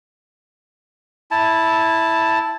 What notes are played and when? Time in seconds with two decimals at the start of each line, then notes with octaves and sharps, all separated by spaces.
1.31 E4 A5